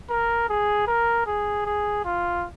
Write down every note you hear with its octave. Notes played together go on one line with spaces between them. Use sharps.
A#4
G#4
A#4
G#4
G#4
F4